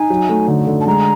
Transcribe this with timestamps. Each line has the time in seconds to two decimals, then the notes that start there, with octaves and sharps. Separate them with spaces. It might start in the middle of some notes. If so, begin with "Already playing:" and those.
Already playing: D#4 G#5
0.10 F#3
0.29 A3
0.48 D3
0.67 D3
0.80 A5
0.87 G#3 A#5